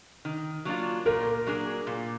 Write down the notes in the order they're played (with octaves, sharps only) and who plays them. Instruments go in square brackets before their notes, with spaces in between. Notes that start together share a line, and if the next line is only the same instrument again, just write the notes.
[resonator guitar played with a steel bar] D#3
F#3 A#3 D4 F4
[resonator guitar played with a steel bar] A#2 [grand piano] A#4
[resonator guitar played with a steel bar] F#3 A#3 D4 G#4
A#2